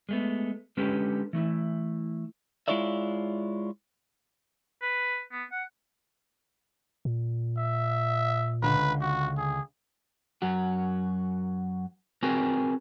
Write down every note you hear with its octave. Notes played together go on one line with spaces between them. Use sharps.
G#3 A3 B3
D3 G#3 C#4 G4 A4 B4
E3 A3 E4
G#3 E4 F4 C#5 D5 E5
B4
B3
F#5
A#2
E5
C#2 D3 B4
F#4
G#4
F#2 F#3 F#4
C4 F#4 G#4 A#4 B4